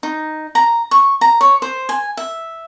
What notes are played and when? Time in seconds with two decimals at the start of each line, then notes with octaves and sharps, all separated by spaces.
0.03 D#4
0.55 A#5
0.91 C#6
1.21 A#5
1.41 C#5
1.62 C5
1.89 G#5
2.17 E5